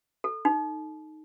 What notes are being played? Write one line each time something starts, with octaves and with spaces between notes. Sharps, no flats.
A4
D#4